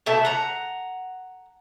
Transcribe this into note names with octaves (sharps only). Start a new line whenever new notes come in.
B2 A3 E5 A5
F#5 A#5